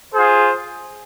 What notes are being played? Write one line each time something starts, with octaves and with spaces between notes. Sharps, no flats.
F4 G#4 C5